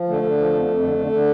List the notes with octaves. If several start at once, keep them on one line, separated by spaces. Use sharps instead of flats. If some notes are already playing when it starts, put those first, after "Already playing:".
Already playing: F3
D3 A3
D3
F3
F2
F2
D3
D3
D3